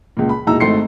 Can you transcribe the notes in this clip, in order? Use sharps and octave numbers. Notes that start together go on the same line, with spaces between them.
C#2 A#2
B5
E1 A#2 D#4 E4 A#5 E6
G#1 A3 D#4 C6 C7 C#7